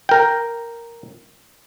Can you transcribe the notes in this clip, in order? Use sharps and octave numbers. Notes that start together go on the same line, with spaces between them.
A#4 G5